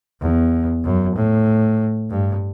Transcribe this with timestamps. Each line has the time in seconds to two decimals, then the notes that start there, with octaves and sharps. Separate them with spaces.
0.21 E2
0.84 F#2
1.16 A2
2.10 G2